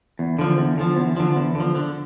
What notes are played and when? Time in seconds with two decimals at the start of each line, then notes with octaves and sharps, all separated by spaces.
0.19 E2
0.39 D3 F3
0.58 E2
0.77 D3 F3
0.97 E2
1.17 D3 F3
1.36 E2
1.55 D3 F3
1.75 D3